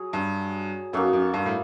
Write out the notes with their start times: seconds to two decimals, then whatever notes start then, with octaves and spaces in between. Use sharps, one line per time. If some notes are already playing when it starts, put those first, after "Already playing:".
Already playing: F#3 G#4
0.13 G2
0.93 F#2 A#3 D#4 F#4 A4
1.13 F#2
1.34 G2
1.46 A2